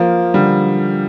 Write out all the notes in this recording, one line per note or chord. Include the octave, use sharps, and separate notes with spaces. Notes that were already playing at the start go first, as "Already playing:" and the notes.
Already playing: F3 A#3
D3 G3